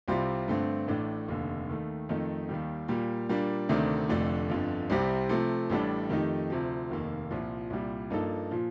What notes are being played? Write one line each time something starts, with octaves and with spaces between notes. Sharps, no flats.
C2 C3 G3 C4 F4
G2 D3 A3 C4
A1 A2 A3 D4
F1 D#2 D3
D#2 D#3 A3
F2 D#3 A3 D#4
D#2 D#3 G3
A#2 G3 A#3
A#2 G3 A#3 D4
D2 C3 D#3 A3 D4
F1 F2 D3 A3 D4
G1 F2 D3
C2 C3 G3 C4 G4
C3 F3 A3
A1 A2 G3 D4 A4
F2 D#3 A3 D#4 G4
D2 C3 F3
F1 D#2 D#3 A#3
C2 A#2 F3
C2 A#2 G3
G2 F3 A#3 D#4 A4
A#2 F3